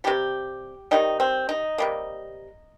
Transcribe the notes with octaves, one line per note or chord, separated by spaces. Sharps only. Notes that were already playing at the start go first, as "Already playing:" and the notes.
C3 D#3 G3 G4
C3 D#3 G3 D#4
C4
D#4
C3 G3 A#3